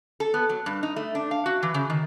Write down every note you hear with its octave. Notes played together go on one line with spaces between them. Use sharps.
A4
B3
F#3
G2
D#4
A3
D4
F5
F#4
E3
C#3
D#3